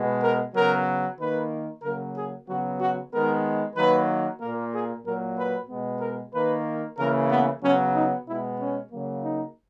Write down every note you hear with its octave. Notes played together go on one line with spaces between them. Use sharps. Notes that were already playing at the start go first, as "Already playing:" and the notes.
Already playing: B2 G#3 B3
A#4
C#3 F#3 B3 A#4
D#3 A#3 B4
C#3 F#3 A#3 A#4
G#4
C#3 F#3 B3 F#4
F#4
D#3 G#3 B3 A#4
D#3 F#3 A#3 B4
A#2 A#3 A#4
G#4
A#2 F#3 A#3 A#4
B4
B2 G#3 B3
A#4
D#3 A#3 B4
C#3 E3 A#3 A#4
B3
C#3 F#3 B3 C#4
D#4
B2 G#3 B3 E4
C#4
C#3 F#3 A#3
D#4